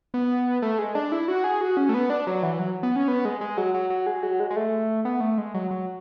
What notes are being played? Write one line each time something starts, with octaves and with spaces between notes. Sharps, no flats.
B3
A3
G#3
D4
E4
F#4
G#4
F#4
C#4
A3
B3
D4
F#3
E3
F#3
B3
C#4
B3
G#3
G#3
F#3
F#3
F#3
G#3
F#3
G#3
G#3
A3
B3
A3
G#3
F#3
F#3